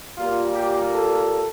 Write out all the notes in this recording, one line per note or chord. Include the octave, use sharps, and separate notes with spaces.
A#2 G3 A#3 F4
G4
A4